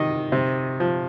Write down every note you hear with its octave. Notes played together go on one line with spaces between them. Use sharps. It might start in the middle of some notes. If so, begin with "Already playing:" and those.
Already playing: C3 D#3 D#5
C3
F3